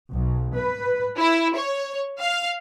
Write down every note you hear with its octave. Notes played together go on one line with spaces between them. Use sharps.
B1
B4
E4
C#5
F5